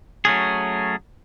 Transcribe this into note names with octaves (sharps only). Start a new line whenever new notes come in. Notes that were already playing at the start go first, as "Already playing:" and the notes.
F#3 A3 C#4 G#4